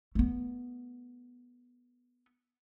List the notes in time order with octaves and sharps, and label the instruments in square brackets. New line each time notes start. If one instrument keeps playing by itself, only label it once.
[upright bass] A3 B3